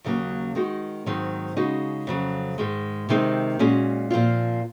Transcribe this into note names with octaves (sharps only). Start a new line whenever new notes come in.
D#2 C#3 F#3 A#3 C#4
D#3 G#3 D#4 F#4
G#2 D#3 F#3 C4
C#3 G#3 D#4 F#4
F2 C#3 F#3
G#2 D#3 G#3
C3 D#3 G#3 C4 D#4
A#2 G#3 C#4 F#4
A#2 F3 C4 F4